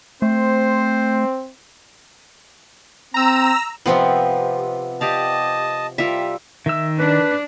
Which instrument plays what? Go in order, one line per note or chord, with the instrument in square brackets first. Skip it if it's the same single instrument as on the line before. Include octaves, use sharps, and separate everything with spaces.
[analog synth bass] A3 [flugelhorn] C4 [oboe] C5
[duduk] C4 [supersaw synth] A#5 E6
[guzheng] C3 F3 B3 [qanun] C4 F4
[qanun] G4 D5 F5 [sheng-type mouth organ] D#5 A5
[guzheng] G3 [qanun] F4 A#4 E5
[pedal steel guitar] D#3 E6 [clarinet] E5
[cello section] D4 [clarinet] B4